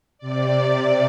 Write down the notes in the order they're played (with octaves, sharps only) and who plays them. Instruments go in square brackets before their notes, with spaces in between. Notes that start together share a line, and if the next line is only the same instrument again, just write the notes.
[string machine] C3 D5